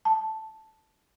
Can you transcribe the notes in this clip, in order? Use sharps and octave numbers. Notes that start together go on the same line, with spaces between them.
A5